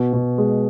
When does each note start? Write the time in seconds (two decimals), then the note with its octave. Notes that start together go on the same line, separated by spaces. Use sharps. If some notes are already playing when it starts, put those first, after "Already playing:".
Already playing: B2
0.13 B2
0.38 G#3